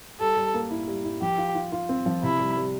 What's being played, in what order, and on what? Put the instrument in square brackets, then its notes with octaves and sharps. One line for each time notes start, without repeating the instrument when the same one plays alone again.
[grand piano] G3 [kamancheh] A4
[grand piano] G3
A#3
E4
G3
E4
[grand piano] F3 [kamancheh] G4
[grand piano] F4
F4
F4
C4
F3
[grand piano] C3 [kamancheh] E4
[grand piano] G3
G3